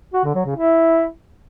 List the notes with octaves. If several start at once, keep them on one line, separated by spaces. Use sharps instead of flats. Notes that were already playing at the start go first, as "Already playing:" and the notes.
F#4
D3
F#3
C#3
E4